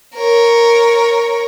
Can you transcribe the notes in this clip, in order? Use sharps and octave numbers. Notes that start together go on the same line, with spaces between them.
A#4 C#5